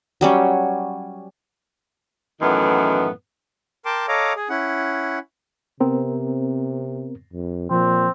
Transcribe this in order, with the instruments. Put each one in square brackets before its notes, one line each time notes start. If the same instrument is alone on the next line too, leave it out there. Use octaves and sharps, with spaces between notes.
[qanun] F#3 G3 C#4
[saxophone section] F#2 A2 D#3 E3 B3
[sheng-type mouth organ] A#4 G5 A5 C6 D6
A4 C#5 D#5 F5 A#5 D6
G#4
C#4 E4 F#5
[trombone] C3 [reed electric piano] B3 C4 A#4
[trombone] F2
[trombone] A#2 [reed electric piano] F3 [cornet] C4